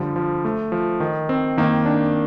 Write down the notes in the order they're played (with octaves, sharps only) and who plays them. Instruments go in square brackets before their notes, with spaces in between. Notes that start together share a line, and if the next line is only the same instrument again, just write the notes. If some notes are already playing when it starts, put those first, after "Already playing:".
Already playing: [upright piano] D3 [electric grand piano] F3 G3
[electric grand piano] F3
A3
F3
D#3
C4
[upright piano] D#3 [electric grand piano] A#3
[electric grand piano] D4